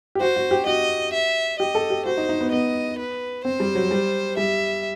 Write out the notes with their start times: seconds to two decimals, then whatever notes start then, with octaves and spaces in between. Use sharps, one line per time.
0.15 G4
0.21 F#4 C5
0.36 F#4
0.51 G4
0.66 F#4 D#5
1.13 E5
1.60 G4 D#5
1.75 A4
1.90 G4
2.06 F#4 C5
2.17 D#4
2.29 D#4
2.41 B3
2.52 B3 D#5
2.99 B4
3.44 C4 C5
3.60 G3
3.75 F#3
3.91 G3
4.37 G3 E5